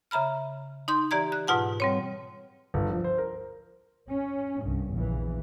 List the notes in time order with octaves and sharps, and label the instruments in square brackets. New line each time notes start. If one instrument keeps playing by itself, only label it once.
[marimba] C#3 E5 A#5 B5 F6
D#4 C6 G6
E3 G4 D5 A#5 G#6
F#6
G#2 B2 F4 F#5 A5
G3 C4 C#5
[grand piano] G1
F3
C5
A#4
[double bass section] C#4
C2 G2
A#1 E2 C#3 E3